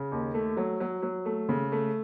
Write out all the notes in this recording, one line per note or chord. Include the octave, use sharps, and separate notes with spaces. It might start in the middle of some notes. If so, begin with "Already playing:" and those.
Already playing: C#3
D#2
A3
F#3
F#3
F#3
A3
C#3
A3